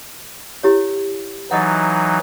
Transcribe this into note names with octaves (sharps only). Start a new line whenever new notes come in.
E4 G4 C#5
E3 F#3 D#4 D#5 F#5